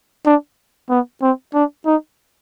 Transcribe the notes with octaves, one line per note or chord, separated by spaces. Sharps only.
D4
B3
C4
D4
D#4